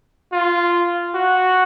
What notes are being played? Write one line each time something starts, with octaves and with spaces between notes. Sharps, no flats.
F4
F#4